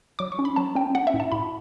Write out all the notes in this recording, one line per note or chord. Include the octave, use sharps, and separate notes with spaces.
F#3 D6
C#6
C#4
B5
F#3 A5
C#4 G5
C#4 F#5
E5
A2
A5
A2 B5